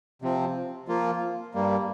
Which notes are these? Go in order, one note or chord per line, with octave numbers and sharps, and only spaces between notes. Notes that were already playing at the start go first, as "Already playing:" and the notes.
C3 F3 C4
F3 A#3 F4
G2 G3 A#3